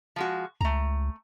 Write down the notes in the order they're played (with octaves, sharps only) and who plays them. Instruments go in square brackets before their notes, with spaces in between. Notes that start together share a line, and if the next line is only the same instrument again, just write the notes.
[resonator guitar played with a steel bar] F3 G#3 F#4
[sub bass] C#2 [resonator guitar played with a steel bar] A3 A#5